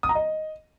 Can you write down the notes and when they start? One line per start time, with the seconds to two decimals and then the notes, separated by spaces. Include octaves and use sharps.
0.03 D#6
0.09 A#5
0.15 D#5